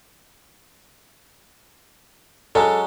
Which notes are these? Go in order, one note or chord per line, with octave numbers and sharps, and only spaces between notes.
F#3 G#3 C#4 A4